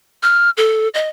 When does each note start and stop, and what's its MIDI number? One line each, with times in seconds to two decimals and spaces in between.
0.23 0.50 89
0.57 0.88 69
0.94 1.09 75